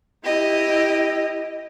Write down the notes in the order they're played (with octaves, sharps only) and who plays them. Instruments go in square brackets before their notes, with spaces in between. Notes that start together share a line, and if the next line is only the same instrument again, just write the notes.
[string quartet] E4 G4 D#5